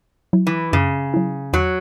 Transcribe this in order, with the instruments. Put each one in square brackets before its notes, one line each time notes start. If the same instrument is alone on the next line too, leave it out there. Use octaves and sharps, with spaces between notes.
[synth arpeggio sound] F#3 E4
[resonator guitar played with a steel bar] E3
[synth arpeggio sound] F#2 [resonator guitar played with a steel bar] C#3
[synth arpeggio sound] F#3 E4
[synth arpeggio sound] E2 [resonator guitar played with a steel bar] F#3